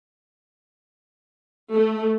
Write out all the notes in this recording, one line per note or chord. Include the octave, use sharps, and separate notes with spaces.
A3